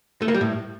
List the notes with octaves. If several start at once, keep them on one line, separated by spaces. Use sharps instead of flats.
A3
A#3
G3
A2